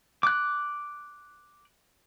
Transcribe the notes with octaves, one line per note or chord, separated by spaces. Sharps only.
D6 F#6